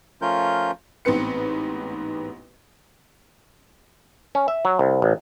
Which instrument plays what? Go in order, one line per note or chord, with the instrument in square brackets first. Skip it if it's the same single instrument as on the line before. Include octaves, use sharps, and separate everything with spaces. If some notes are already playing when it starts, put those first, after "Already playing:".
[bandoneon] F3 A3 C#4 F4 A#4 G6
[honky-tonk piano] A1 G#2 B3 C4 B4 C#7
[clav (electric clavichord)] C#4
E5
F#3
C2
A1